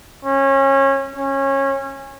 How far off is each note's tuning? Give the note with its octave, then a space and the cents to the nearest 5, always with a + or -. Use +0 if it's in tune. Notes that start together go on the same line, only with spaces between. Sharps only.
C#4 -25
C#4 -20